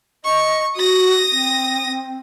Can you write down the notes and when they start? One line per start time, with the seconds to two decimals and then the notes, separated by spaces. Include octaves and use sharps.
0.25 D#5 C#6
0.77 F#4 D#6 A#6
1.32 C4